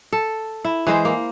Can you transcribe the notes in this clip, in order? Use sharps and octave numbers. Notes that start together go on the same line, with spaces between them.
A4
E4
E3 G#3 C5
A#3